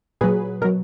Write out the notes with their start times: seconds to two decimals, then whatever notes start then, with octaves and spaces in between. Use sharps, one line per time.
0.21 A#2 F#3 G#4 B4
0.61 B2 A#4
0.65 F#3